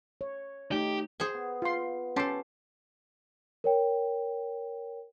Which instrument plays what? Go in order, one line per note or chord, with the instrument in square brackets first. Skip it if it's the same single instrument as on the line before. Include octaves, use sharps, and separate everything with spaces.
[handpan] C#5
[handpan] A3 D#4 [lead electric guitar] G4
[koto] G#4 C5 G#5
[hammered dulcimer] B3
[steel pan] F4 C6
[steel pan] C#4 A5 C6 [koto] G4 A4
[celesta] A#4 C#5 G5